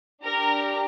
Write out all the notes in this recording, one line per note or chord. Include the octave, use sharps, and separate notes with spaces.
D4 G4 A#4 A#5